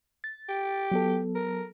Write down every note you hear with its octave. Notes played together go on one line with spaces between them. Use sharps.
A6
G4
F#3 B3 A4
A#4